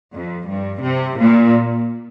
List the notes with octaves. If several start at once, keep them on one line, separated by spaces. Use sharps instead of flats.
F2
G2
C3
A#2